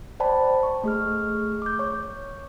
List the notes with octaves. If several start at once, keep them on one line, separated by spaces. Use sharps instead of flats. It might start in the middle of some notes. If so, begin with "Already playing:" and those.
C5 D5 G5 A5 B5
C#6
A3 G#4 F6
D6 G6
C#5 C#6